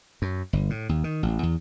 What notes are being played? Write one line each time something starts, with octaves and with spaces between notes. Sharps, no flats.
F#2
G1
A2
D#2
D#3
A1
E2